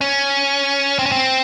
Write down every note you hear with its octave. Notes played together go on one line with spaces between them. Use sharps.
C#4
C4
C#4
C4